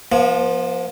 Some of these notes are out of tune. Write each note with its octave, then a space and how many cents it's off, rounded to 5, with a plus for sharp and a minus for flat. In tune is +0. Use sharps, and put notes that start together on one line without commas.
F3 +0 B3 -45